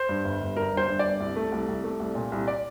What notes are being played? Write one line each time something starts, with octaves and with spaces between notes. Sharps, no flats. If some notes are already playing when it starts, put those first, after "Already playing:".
Already playing: C5
G2
G1
G1
G2 A#4
G1 C5
G2
D5
G1
C2
A3
C2
C2
A3
C2
A#2
C2
D5